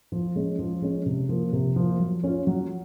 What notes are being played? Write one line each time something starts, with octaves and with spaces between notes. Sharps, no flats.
F3
G#3 C#4
F3
G#3 C#4
C3
F3 A#3
C3
F3 A#3
F#3
C#4 F4
F#3